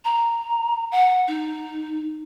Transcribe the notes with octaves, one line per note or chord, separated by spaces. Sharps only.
A#5
F#5
D#4